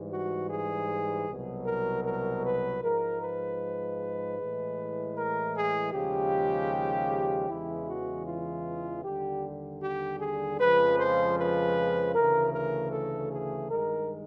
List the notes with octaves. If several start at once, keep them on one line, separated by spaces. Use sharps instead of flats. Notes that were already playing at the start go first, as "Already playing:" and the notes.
Already playing: G#2 E3 G3
F#4
G#4
C2 B2 F#3
A#4
A#4
B4
G#2 F3 G#3 A#4
B4
A2 E3 G#3
A#4
G#4
D#2 C#3 F3 G#3 G4
E2 C#3 E3 G#3 E4
F#4
F4
D#2 D3 G3 G4
G4
G#4
F2 C#3 F3 G#3 B4
C5
B4
D2 C#3 E3 A3 A#4
A#4
A4
G#4
G2 D#3 G#3 A#4